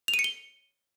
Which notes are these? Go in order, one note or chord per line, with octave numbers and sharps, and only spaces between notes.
F7
D#7
C#7
G7